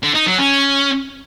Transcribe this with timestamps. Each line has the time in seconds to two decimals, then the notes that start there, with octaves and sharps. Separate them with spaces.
0.03 D3
0.15 D#4
0.27 F#3
0.38 C#4